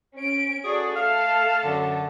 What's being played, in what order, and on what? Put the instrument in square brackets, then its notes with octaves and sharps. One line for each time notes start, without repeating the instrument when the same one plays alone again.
[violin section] C#4 D7
[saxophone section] F#4 G#4 [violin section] A4 D5
[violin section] A3 A4 A5 [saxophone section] F5
[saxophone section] F#2 D3